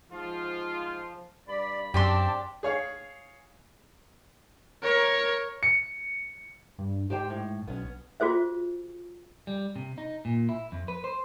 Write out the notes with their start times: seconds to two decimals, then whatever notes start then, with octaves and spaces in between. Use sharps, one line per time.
0.11 G#2 F3 F4
1.47 G2 D5 B5
1.94 F#2 C#3 C4 D4 G4 D5 A5 C6
2.63 G#4 C#5 F5
4.83 A#4 C#5
5.63 C#7
6.78 G2
7.10 G#2 G4 C5 G5
7.30 A2
7.67 B1 B3 C#4
8.20 F4 F#4 G#4 C5 E5
9.47 G3
9.76 C3
9.98 D#4
10.25 A#2
10.49 E4
10.72 F2
10.88 B4
11.04 C5